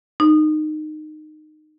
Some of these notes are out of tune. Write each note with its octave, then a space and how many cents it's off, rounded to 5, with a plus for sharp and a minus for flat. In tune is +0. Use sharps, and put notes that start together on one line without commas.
D#4 -20